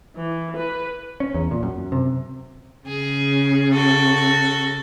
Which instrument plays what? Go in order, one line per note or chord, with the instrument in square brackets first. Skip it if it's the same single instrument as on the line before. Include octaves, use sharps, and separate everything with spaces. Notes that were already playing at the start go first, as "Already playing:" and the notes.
[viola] E3
B4
[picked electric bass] C#4
E2
A#2
F#2
C3
[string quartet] C#3 [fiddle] G#4
[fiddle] F#4 A4